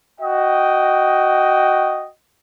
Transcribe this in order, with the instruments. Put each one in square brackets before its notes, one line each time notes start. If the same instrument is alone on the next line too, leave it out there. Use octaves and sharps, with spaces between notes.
[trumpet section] F#4 D#5 G5